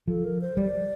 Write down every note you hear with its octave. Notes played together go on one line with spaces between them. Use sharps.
F3 A4
A#4
C5
G3 D5